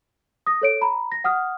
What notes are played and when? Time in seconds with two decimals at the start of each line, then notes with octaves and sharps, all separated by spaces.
0.46 D#6 A#6
0.62 A4 C#5 D7
0.81 A#5 B5
1.12 A#6
1.24 F#5 D#6 F6